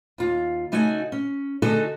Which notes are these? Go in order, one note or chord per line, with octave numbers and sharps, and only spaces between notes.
D#2 F4
C#3 A3 D#4 F#4 F#5 G#5
C#4
D3 A3 D#4 F#4 G#4 A4